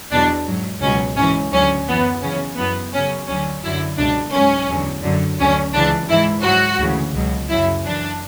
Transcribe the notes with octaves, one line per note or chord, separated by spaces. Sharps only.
E2 B2 F#3 D4
G#2 F#3
C#2 B2 F#3 C#4
G#2 E3 C#4
D2 D3 F#3 C#4
F#2 E3 B3
F#2 C#3 E3 C#4
F#2 E3 B3
F#2 C#3 F#3 C#4
D2 D3 F#3 C#4
F#2 D3 F#3 E4
C#2 B2 F#3 D4
G#2 F#3 C#4
E2 D3 F#3
F#2 D3 F#3
D2 D3 F#3 C#4
C#2 C#3 E3 D4
G#2 E3 E4
G#2 F#3 F#4
D2 C#3 E3
C#2 B2 F#3
F#2 C#3 F#3 E4
F#2 E3 D4